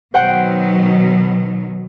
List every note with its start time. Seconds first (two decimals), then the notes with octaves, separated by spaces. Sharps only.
0.14 B2 D#3 F#3 C5 F#5 G5